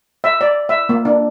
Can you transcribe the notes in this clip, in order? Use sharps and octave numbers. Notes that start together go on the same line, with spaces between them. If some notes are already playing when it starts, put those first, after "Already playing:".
E5
D5
E5
A#3
D4